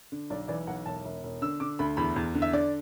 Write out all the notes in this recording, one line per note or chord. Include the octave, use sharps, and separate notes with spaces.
D3
B1 D5
E3 D5
B1 F#5
E1 A5
E1
E1
D3 E6
D3 D6
D2 B5
E2 B5
E2
D3
E5
D3 D5